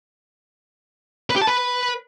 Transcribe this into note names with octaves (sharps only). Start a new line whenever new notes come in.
B4
G4
A5
B4